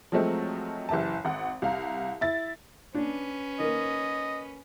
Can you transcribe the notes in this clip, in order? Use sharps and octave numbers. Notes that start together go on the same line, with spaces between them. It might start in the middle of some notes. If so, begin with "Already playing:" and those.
F3 F#3 G#3 A3 C4
F#1 E3 E4 G4 A5
G#1 F#5
C2 F5 A#5
E4 A6
C#4 D4 B4
D#3 A#3 D#5